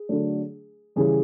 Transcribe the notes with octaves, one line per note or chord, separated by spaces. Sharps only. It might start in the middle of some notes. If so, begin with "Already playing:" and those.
Already playing: G#4
D3 F#3 A3 D4
C#3 E3 G3 G#4